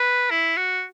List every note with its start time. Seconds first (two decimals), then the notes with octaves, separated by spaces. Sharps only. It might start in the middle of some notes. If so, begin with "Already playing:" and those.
Already playing: B4
0.30 E4
0.57 F#4